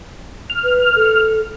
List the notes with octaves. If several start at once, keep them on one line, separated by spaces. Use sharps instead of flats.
F6
B4
A4